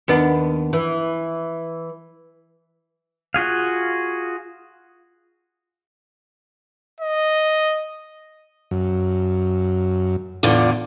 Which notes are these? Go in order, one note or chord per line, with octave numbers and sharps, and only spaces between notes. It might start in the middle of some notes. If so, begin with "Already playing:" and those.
D#2 B3 D4
E3
F4 F#4 G#4 F5
D#5
F#2
E2 A2 D3 F4 D5